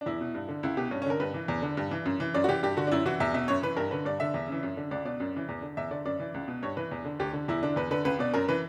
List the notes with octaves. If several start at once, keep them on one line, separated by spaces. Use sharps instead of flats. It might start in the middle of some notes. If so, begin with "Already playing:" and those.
D4
E2 E4
B2
G2
D3
C#2 E4
B2 G4
G2 C#4
C#4
D3 A#4
G2 B4
E3
E2
D3
G2
E3
F#2
E3
F#2 D5
F#4
E3 G4
G2 G4
D3 F#4
D4
F#2 E4
E3 F#4
E2 E5
B2 E5
F#2 C#5
E3 B4
G2 A#4
D3 B4
G2 D5
D3 E5
E2
C#3 E3
F#2
D3
C#2 D5
B2 D5
F#2
C#3 E3
E2
D3
E2 E5
D3 D5
F#2 D5
E3
C#2
B2
G2 C#5
E3 B4
E2
D3
D2 G4
D3
E2 E4
D3 D4
E2 B4
D3 B4
C#2 B4
B2 D5
F#2 A#4
E3 B4